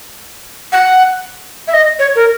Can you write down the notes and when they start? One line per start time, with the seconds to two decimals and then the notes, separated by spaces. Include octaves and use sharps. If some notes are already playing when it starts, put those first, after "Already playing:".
0.72 F#5
1.68 E5
1.74 D#5
1.99 C#5
2.16 A#4